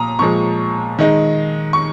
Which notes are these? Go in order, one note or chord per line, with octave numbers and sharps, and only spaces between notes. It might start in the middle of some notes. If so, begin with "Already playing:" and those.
Already playing: A#2 F3 A#5 D#6
A#2 F3 G#3 C#6
D#3 G#3 D#4
C#6